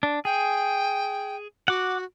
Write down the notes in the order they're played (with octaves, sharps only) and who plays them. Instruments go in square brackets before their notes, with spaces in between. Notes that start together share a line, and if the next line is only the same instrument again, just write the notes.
[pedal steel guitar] D4
[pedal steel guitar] G#4 [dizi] G5
[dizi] F#4 [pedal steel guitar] F#5 D6